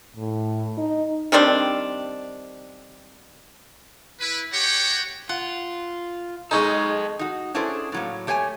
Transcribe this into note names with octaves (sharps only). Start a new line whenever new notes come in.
A2
D#4
D#3 G3 C4 D4
E4 B4
F#4 G4 C#5 F#5 G5
F4 F#5
G#3 C#4 D#4 A4 D#5
D#4 F#4
C#4 D4 E4 G#4 A4 C5
A2 F#3 A#3
A3 G4 C#5 F#5 G#5